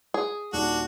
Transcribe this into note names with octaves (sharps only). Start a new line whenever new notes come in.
G#4
D#1 D#3 D4 F#4 F#6